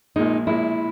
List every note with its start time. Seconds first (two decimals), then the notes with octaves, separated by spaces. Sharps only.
0.16 A#1 A#2 G#3 D#4
0.47 A#1 A#2 G#3 E4